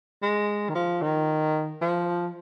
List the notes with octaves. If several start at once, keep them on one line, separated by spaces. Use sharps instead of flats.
G#3
D#3
F3
D#3
F3